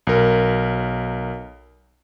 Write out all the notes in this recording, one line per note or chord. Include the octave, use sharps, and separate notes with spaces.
B1 A#4